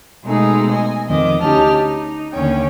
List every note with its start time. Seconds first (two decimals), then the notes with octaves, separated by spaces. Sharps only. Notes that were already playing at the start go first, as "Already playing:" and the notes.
0.24 B2 G#3 A3 D#4 G#4
0.71 D#5 G#5
1.07 F2 D#3 D#5 D6
1.41 D2 C#4 D#4 G4 A5 F6
1.81 D#4
2.32 D#2 D3 C#4 C#5 G5